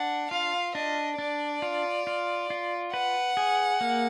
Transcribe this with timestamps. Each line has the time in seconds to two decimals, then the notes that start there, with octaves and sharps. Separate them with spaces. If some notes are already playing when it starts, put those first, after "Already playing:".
Already playing: D4 F#5
0.31 F4 F5
0.75 D4 D#5
1.18 D4 D5
1.62 F4
2.07 F4
2.50 F4
2.93 B4 F#5
3.37 G#4
3.81 A#3